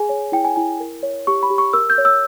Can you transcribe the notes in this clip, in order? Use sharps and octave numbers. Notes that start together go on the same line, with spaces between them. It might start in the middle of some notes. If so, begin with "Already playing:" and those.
Already playing: G#4 G#5
C#5
E4 G5
G#5
E4 G#5
A#4
C#5
G4 C#6
B5
G4
C#6
A#4 E6
G6
C#5
E6